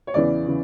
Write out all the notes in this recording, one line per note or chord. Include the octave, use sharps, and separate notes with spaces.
C#5
E2 C#3 E3 D5
C#3 E3